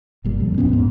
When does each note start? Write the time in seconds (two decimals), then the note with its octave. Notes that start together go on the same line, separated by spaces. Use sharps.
0.24 G1 A#2 G3
0.40 F2
0.58 E2 G2 B3 C#4
0.69 C#2 G#2